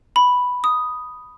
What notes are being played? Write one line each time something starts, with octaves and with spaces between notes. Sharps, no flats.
B5
D#6